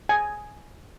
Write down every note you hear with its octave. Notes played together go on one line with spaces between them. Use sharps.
G#5